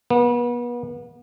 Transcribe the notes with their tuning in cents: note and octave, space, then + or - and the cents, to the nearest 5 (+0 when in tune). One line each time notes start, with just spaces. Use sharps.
B3 -35